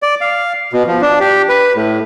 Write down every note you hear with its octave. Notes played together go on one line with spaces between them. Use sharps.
D5
F5
B2
F3
D4
G4
B4
A2